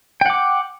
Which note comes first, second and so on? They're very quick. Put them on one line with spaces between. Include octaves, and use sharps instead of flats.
G5 F#5 D6